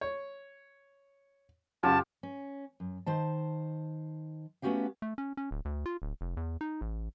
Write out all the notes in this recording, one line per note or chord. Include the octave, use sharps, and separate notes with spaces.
C#5
F#2 C#3 F4 G4 A5
C#4
F#2
D#3 C5 A5
A3 B3 C#4 F#4 G4 F5
A3
C#4
C#4
D1
D2
F4
D1
F1
E2
D#4
A1